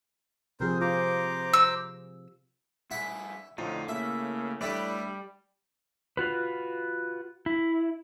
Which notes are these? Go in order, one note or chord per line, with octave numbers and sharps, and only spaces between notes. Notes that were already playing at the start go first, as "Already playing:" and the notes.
C3 F3 C4 G#4 A#4 C5
F4 C5 A#5 D6
E6
G2 E4 G#4 F#5 B5
F2 A2 D3 D#4 F4
C#3 A#3 E5
G3 A3 D4 E4 G4 B4 D5
F4 F#4 B4
E4